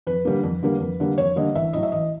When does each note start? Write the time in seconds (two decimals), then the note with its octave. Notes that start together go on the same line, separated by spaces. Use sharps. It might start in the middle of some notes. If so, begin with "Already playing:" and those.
0.07 F2 B4
0.25 D3 G3 A#3
0.43 F2
0.63 D3 G3 A#3
0.80 F2
1.00 D3 G3 A#3
1.18 F2 C#5
1.36 D3 G3 A#3 D#5
1.55 A1 E5
1.73 A2 F#3 D#5
1.83 E5
1.92 A1 D#5